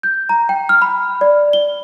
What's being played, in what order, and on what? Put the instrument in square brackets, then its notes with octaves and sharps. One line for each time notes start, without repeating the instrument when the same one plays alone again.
[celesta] G6
A#5
G5
F6
B5
D5
G7